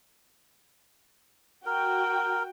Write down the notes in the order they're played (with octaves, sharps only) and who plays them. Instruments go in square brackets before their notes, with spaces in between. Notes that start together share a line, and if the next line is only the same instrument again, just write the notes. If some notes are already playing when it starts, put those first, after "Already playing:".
[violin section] F#4 G5 [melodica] A#4